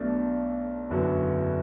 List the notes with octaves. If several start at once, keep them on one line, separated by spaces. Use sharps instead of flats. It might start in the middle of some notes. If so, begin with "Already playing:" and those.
Already playing: B1 B2 A3 D4
F#1 E2 D3 F#3 B3